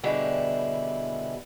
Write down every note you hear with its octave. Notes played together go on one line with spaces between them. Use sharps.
B2 D3 G3 E4 G4 G#4